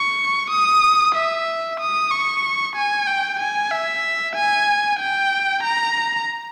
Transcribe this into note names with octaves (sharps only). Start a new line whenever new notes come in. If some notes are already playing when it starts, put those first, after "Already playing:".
Already playing: C#6
D#6
E5
D#6
C#6
G#5
G5
G#5
E5
G#5
G5
A#5